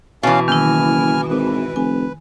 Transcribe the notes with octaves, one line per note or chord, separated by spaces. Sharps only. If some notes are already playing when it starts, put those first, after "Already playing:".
B2 E3 C#4 F5
F#1 D#3 E4 G#5 F6
G#1 B4
F1 G#5